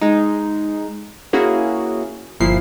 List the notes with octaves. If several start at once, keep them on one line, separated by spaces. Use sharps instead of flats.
G#3 D#4
A#3 C#4 E4 F#4 G#4
G1 A#2 F3 E4 C7